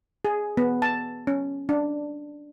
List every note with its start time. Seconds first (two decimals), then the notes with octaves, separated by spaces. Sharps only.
0.25 G#4
0.57 B3
0.82 A5
1.27 C#4
1.69 D4